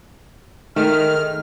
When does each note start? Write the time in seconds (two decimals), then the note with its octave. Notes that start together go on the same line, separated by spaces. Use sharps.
0.76 D#3 G#3 A3 F6